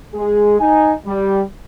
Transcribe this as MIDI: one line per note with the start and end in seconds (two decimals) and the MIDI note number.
0.14 0.60 56
0.14 0.60 68
0.60 0.92 63
0.60 0.92 80
1.06 1.42 55